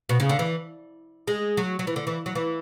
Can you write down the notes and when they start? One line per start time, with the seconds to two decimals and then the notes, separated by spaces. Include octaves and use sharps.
0.09 B2
0.20 C#3
0.29 D3
0.39 E3
1.28 G#3
1.57 F#3
1.79 F#3
1.87 E3
1.96 D3
2.07 E3
2.26 F#3
2.35 E3